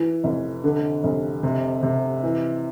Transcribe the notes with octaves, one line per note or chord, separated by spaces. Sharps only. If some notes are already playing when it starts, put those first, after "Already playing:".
Already playing: E3
F1
D3
F1
C3
C3
E3